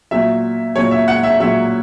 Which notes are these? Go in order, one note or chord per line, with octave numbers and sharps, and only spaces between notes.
A#2 F#3 E5
A#2 F#3 C#5
E5
F#5
E5
A#2 F#3 E5